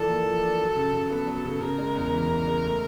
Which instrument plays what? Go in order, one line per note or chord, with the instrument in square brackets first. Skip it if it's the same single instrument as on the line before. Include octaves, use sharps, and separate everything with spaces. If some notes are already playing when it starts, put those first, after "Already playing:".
Already playing: [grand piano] D3 E3 F3 D4 [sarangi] A4
[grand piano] A#3
F3
D4
F#3
C#3
C#3
[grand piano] B3 [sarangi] A4
[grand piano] F#3
C#3
[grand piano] C#3 [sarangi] A#4
[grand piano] G#3
E2
E3
C#3
G#3
A3